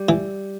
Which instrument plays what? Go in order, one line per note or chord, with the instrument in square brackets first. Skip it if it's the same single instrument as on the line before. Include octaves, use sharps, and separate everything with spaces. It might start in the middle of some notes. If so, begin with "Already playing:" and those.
Already playing: [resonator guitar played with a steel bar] G3
[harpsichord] E3